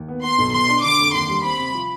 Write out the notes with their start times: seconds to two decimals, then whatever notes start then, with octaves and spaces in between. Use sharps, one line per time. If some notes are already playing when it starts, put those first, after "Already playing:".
Already playing: D#2
0.08 B3
0.23 B3 C6
0.38 B1
0.53 B2 C6
0.69 D4
0.84 D3 D6
0.99 F1
1.14 D#2 C6
1.29 G3
1.44 C4 B5
1.59 C3
1.75 F3